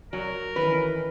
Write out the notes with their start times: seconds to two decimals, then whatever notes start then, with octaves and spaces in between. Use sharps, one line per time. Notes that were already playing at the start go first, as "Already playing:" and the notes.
0.13 F#3 A#4
0.56 D#3 E3 C#4 B4